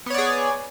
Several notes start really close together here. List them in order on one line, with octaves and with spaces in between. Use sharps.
B3 C#5 D5 G#4